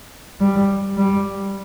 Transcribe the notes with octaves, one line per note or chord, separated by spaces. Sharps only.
G3
G3